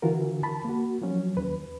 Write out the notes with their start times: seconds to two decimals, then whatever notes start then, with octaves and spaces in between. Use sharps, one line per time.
0.02 D3 E3 F4 F#4 A#4
0.43 A5 B5
0.65 A#3 F#4
1.02 F3 F#3 C#4
1.37 D#2 B4